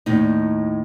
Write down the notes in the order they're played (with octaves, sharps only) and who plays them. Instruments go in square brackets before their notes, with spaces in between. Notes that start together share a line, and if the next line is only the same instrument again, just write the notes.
[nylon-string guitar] D#2 A2 D#4